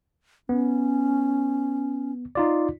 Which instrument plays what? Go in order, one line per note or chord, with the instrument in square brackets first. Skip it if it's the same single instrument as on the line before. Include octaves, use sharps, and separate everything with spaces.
[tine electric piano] B3 [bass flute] C#4
[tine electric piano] D#4 F4 D5